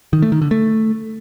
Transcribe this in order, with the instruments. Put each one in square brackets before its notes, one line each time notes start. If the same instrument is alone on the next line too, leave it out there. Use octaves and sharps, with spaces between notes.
[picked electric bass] D#3
A3
D#3
D3
A3